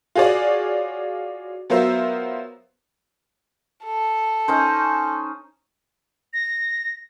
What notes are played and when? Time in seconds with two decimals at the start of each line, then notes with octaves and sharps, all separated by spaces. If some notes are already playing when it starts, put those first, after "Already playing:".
0.15 F4 F#4 G#4 C#5 D5
1.70 F#3 B3 F4 A#4 C5 E5
3.85 A4
4.48 C#4 D#4 C5
6.34 A#6